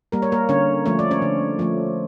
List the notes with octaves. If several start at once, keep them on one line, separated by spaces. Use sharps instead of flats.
G3 A#3 A#4
C#5
A#3 A#4
D3 C#4 C#5
F3 A3 C#5
D5
C#4 C#5
D3
F3 A3